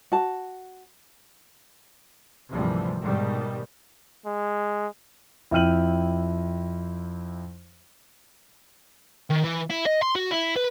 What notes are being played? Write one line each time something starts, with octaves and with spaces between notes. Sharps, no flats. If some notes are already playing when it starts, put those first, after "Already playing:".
F#4 A5
G#1 D2 C3 E3 F3 G3
G#2 B2 D#3 G3
G#3
F2 E4 G5 F6 D#7 F#7
D#3
E3
E4
D#5
C6
F#4
E4
B4